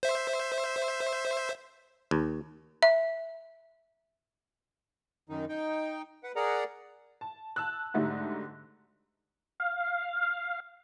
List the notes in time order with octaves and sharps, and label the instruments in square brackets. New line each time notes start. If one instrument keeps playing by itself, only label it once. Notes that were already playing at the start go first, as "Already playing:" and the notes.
[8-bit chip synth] C5 E5
[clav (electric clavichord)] D#2
[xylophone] E5
[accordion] F#2 D#3 D#4
D#4 G5
B4 F#5
G#4 A#4 D5 F#5 A#5
[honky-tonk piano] A5
A5 E6 F#6
G#2 D3 G3 A3 D#4 F#4
[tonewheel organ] F5